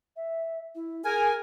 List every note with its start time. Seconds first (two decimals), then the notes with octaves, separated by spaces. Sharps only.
0.16 E5
0.75 E4
1.05 G#4 A#4 G#5